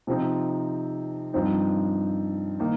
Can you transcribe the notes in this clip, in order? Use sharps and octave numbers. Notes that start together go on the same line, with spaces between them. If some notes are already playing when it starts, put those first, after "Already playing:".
C3 F3 C4 D#4
G2 F3 C4 D#4
D#3 A#3 D#4